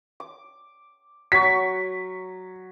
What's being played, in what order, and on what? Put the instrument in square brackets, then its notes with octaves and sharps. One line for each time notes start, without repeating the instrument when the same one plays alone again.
[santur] D6
[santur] F#3 C#6 [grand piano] B6